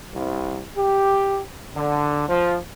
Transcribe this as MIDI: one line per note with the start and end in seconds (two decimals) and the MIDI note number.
0.13 0.61 36
0.76 1.39 67
1.75 2.23 50
2.28 2.57 53